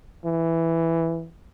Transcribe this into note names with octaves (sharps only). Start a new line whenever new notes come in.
E3